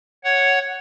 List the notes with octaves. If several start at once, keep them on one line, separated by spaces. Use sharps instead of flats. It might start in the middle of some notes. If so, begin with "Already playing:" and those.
C#5 F#5